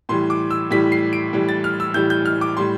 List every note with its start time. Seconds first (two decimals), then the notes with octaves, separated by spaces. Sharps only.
0.09 A2 E3 G3 C6
0.30 D6
0.51 E6
0.71 A2 E3 G3 B6
0.92 C7
1.13 D7
1.33 A2 E3 G3
1.49 A6
1.64 F6
1.80 E6
1.94 A2 E3 G3 G6
2.10 G6
2.25 F6
2.41 D6
2.57 A2 G3 C6